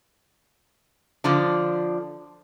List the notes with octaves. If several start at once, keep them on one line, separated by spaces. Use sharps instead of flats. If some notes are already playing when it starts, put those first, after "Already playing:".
D3 F3 D4